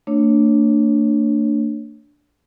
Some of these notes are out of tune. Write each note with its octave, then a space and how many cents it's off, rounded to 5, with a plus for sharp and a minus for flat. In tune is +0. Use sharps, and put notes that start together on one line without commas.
A3 +45 D4 +0 C#5 +0